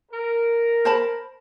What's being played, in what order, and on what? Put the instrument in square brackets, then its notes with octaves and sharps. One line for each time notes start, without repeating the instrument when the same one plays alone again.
[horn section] A#4
[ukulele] C5 A5 B5